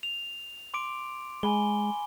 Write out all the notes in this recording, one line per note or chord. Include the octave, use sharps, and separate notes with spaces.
F7
C6 D6 D7
G#3 G#5 B5 G7